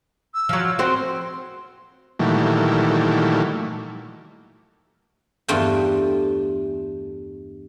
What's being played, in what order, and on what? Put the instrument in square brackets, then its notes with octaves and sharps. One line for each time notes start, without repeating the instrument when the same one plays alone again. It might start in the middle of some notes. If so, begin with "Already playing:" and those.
[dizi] E6
[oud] F3 F#3
C4 F#4 C5
[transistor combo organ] A#2 D#3 E3 F#3 G3 A3
[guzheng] E2 G2 A3 F4 G5